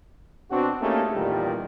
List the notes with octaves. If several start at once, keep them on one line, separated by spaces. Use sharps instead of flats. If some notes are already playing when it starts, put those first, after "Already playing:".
B2 C4 D4 F#4
A3 A#3 C#4 D#4 G4 G#4
E2 A#2 D#3 G3